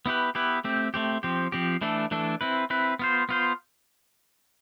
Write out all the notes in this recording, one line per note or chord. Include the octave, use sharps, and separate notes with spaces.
B3 E4 G4 B4
B3 E4 G4 B4
A3 C4 G4
A3 C4 G4
F3 C4 G4
F3 C4 G4
E3 A3 D4 A4
E3 A3 D4 A4
C4 E4 B4
C4 E4 B4
B3 F4 C5
B3 F4 C5